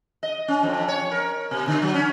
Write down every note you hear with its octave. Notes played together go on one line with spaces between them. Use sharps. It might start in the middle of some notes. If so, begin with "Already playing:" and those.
D#5
C#4
F2
C#5
A#4
B2
D3
F#3
C#4